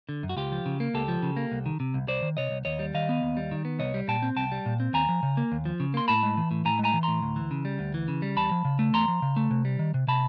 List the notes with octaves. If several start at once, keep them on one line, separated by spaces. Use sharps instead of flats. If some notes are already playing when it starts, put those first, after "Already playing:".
D3
F#2
F#4
C#2 F4 G4
F3
C#3
A#3
C#2 G4 A4
F3
C#3
A#3
C2
D#3
C3
C2
C2 C5 D5
D#3
C3 C#5 D#5
C2
D#2 C#5 D#5
G3
D#3 D#5 F5
B3
D#2
G3
D#3
B3
C2 C#5 D#5
G3
A#2 G5 A5
C4
C2 G5 A5
G3
A#2
C4
D#2 G#5 A#5
F3
C#3
A#3
D#2
F3
C#3
A#3 C6
A2 A5 B5
G#3
E3
A2
A2 G#5 A#5
G#3
G#5 A#5
E3
A2 A#5 C6
D2
E3
C#3
G3
D2
E3
C#3
G3
E2 A5 B5
F3
C#3
A3
E2 A#5 C6
F3
C#3
A3
C3
G3
D#3
C3
C3 A5 B5